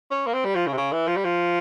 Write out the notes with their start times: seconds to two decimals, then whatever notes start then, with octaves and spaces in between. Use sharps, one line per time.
0.11 C#4
0.26 A#3
0.34 C4
0.45 G3
0.55 F3
0.67 C#3
0.73 C3
0.77 C#3
0.92 E3
1.07 F3
1.16 G3
1.25 F3